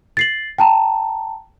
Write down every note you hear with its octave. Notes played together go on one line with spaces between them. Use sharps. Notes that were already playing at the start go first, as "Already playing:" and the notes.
A6 C7 F#7
G5 A5 A#5